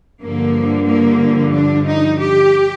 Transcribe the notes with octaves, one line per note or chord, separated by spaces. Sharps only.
G2 D3 F3 A#3
A#3
D4
D#4
G4